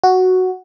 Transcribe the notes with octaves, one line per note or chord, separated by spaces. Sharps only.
F#4